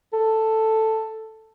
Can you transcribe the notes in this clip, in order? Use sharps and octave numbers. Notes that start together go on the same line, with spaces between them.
A4